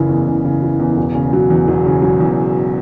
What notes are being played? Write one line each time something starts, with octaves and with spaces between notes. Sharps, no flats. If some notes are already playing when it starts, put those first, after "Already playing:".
Already playing: F#1 C#3 E3
E2
F#1
C#3
E3
E2
E1
C#3
F#3
E2
E1
C#3
F#3
E2